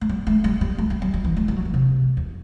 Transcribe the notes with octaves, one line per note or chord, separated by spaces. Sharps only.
A3
G3
A3
G3
G3
A3
G3
G3
F#3
E3
A3
G3
F#3
E3
C3
E2